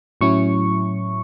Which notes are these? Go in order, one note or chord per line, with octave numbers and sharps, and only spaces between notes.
A2 F#3 C#4 E4 C#6